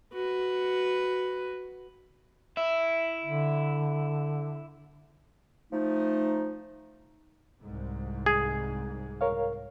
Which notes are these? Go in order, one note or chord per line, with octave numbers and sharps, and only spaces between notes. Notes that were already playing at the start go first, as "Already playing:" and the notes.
F#4 B4
E4 E5
D3
F3 A3 D#4
C2 G#2
G#4
A#4 C#5 F5